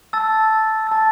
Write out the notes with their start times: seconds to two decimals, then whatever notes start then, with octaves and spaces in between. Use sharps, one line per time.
0.13 A5 E6 A6
0.87 A5 E6 A6